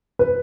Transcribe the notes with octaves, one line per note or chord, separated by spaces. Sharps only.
B4